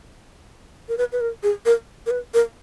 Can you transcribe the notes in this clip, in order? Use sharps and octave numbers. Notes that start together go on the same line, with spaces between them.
A#4
B4
B4
A#4
G#4
A#4
A#4
B4
A#4